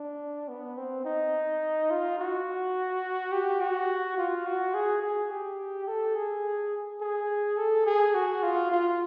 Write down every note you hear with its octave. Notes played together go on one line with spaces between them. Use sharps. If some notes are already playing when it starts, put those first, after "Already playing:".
Already playing: D4
B3
C4
D#4
F4
F#4
G4
F#4
F4
F#4
G#4
G#4
G4
A4
G#4
G#4
A4
G#4
F#4
F4
F4